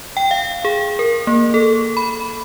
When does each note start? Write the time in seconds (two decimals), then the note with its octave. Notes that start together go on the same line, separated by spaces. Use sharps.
0.17 G5
0.31 F5
0.65 G#4
0.99 A#4
1.27 A#3
1.54 A4
1.97 B5